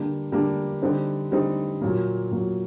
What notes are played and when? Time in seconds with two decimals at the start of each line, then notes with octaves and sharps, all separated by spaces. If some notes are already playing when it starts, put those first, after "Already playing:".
Already playing: D3 G3 A#3 D4
0.32 D3 G3 A#3 D4
0.82 D3 G3 C4 D#4
1.32 D3 G3 C4 D#4
1.81 A#2 F#3 A#3
2.31 A#2 F#3 A#3